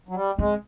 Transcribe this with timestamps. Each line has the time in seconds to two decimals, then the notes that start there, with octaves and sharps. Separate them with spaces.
0.09 F#3
0.15 G3
0.39 G#3 C4